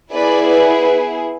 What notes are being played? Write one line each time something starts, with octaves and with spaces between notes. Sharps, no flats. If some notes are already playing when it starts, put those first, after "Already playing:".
B3 E4 G#4 B4 D5
B4